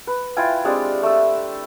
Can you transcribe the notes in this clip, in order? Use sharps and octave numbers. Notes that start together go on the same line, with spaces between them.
B4
E4 F4 G5 G#5
G#3 C4 D4 G4
A3 E5